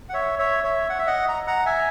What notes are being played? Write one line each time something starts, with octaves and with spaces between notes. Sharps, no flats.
F#5
C#5 E5
C#5 E5
C#5 E5
F#5
E5
D#5 F#5
A#5
F#5 A#5
E5 G#5